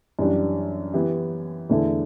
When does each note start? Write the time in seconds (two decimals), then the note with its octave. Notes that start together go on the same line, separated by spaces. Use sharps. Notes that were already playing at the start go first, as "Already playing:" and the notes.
0.19 F#2 E3 G3 D4 G4
0.94 E3 B3 E4 G4
1.70 E2 D3 A3 E4 A4